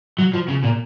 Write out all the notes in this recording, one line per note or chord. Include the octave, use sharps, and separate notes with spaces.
F#3
F3
C#3
A#2